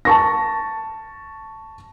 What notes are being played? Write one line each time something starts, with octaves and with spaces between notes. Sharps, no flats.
A5 C#6 A#6